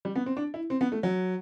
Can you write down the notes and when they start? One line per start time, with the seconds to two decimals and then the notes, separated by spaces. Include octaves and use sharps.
0.05 G3
0.16 B3
0.26 C4
0.37 D4
0.54 E4
0.70 C4
0.81 B3
0.92 A3
1.03 F#3